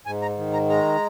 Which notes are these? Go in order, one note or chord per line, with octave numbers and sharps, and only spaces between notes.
G#2 G#5
A#5
D#3
A#5
G#3 A#5